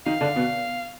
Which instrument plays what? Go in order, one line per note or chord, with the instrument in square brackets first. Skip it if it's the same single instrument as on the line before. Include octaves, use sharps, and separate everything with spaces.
[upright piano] D#3 D#4 [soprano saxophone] F5
[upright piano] D3 D4
B2 B3